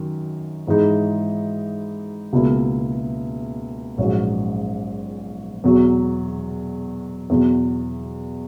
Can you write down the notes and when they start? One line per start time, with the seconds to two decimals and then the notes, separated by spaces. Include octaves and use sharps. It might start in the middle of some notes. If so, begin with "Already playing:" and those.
Already playing: F#2 D#3
0.67 G#2 E3 G#3 D#4
2.33 C#2 B2 A#3 E4
3.97 A#1 G#2 F#3 C#4
5.64 E2 B2 F#3
7.30 E2 B2 F#3